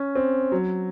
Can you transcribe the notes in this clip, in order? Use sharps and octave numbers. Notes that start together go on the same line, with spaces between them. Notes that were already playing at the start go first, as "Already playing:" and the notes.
Already playing: C#4
C4
F#3